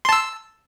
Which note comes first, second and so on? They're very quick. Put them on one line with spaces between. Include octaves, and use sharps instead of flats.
C6 A5 E6